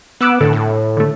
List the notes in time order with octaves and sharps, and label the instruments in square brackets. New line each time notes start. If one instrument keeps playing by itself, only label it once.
[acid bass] B3 [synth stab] D6 E6 F#6
[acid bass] A2 [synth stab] D3 A4
[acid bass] A2
[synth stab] D3 A3